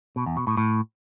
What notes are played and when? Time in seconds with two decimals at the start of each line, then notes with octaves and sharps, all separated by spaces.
0.16 B2
0.26 E2
0.37 B2
0.47 A2
0.57 A2